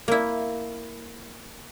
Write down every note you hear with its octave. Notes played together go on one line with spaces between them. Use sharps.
A#3 E4